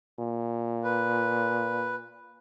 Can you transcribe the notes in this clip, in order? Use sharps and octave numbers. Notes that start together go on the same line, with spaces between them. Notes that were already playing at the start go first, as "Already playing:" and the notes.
A#2
B4